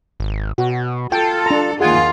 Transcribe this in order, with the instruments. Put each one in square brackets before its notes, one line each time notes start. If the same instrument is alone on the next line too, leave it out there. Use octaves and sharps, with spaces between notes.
[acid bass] G#1
[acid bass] B2 [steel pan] F#4
[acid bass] F4 [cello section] A4 [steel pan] G5
[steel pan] D4 A#5
[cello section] D#2 F4 [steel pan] G#4 F#5 G#5